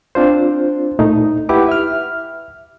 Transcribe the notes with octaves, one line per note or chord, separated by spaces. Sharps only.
C4 D4 F4 C5
A#2 A3 D#4
E4 G4 B4 F#5 D6
E5 F6